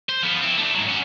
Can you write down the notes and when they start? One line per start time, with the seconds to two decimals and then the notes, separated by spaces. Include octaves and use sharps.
0.09 C5
0.23 F3 B3
0.41 C4 E4
0.57 A3 D4
0.74 G#2 F#3
0.89 C#4 F#4